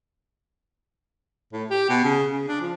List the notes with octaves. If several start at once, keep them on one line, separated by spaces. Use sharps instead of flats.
A2
G4
B2
C#3
C#3
D4
F3